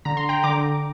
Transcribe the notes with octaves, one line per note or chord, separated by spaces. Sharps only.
D3 A#5
C6
G5 A#5
D3 A#5 D6